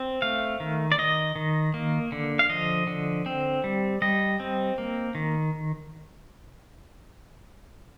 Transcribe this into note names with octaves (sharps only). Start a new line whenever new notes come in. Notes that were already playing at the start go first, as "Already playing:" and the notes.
Already playing: C4
A3 F5
D#3
D5
D#3 D#5
D#3
A#3
D3
F5
F3 D#5
D3
C4
G3
G3 D#5
C4
A#3
D#3